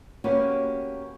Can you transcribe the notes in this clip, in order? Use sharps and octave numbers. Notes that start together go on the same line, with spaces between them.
A#3 B3 C#4 F#4 G4 B4